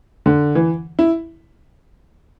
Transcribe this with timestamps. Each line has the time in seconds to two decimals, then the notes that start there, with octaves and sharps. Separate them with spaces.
0.26 D3
0.55 E3
0.99 E4